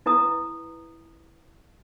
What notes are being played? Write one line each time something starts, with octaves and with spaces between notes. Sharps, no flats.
E4 B4 A#5 D#6